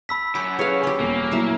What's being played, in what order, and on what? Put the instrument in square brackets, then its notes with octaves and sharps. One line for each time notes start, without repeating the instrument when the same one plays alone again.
[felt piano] A5 [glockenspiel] B5 E6 B6
[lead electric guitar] F#2 [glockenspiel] B5 [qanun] D6
[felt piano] G#4 A4 B4 [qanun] C#5 F5
[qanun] C#4 G4
[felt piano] D#1 E2 [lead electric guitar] A#3
[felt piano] A#2 F#3 A3 [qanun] E4 E5